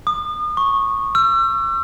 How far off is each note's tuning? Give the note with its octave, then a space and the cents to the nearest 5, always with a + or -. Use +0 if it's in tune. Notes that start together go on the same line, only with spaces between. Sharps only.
D#6 -40
C#6 -10
E6 +40